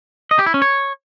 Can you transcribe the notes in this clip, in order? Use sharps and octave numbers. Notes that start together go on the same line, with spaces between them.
D#5
G4
E4
C#4
C#5